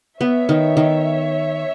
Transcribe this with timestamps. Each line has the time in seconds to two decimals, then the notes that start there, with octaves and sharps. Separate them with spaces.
0.21 B3 C#5 E5
0.49 D#3
0.77 D#3